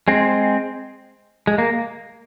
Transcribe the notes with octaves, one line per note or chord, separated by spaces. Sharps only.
G#3 C4
G#3
A#3